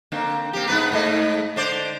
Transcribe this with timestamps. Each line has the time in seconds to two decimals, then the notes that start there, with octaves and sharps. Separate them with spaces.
0.12 D3 A#3 C4
0.53 A#3 C4 G4
0.67 G#2 B3 B4
0.92 G#2 A3 D#5
1.56 D3 C5 D5